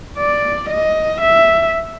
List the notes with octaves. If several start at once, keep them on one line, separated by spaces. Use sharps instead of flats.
D5
D#5
E5